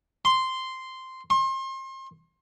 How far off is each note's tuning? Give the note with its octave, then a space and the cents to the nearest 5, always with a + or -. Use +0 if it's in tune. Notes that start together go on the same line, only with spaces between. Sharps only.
C6 -5
C6 +35